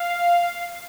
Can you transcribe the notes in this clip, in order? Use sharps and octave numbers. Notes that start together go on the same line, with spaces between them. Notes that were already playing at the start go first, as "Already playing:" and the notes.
Already playing: F5